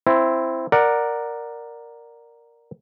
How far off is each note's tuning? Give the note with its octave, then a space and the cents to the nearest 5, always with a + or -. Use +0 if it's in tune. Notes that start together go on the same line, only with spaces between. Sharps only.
C4 +0 E4 +10
A#4 +0 D5 +10 F#5 +0